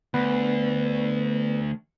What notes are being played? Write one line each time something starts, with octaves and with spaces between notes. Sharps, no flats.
D2 B3 B4